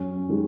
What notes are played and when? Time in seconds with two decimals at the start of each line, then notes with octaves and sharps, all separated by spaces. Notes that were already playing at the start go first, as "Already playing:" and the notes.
Already playing: F#2 C#4
0.29 D#3 G#3